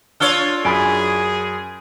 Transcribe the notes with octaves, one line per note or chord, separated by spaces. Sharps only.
D4 F4 C#5 E6 F6 G7
F#2 G#4 G#5 B5 D7